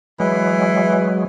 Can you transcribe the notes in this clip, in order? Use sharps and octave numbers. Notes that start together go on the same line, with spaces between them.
E3 F#3 G#3